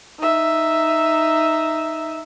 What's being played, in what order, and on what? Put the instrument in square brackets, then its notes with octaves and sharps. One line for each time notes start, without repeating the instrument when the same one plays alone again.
[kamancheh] D#4 E5